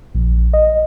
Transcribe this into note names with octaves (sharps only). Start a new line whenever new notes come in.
A#1
D#5